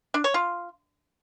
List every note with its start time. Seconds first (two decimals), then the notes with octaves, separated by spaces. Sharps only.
0.14 D4
0.24 C#5
0.34 F4